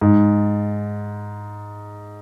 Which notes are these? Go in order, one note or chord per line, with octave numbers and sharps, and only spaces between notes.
G#2